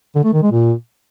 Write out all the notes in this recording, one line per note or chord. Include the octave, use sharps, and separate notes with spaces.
D3
A3
D#3
G#3
A#2